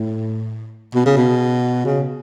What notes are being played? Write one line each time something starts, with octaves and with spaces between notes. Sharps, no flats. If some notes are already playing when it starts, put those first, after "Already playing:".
Already playing: A2
B2
C#3
B2
C#3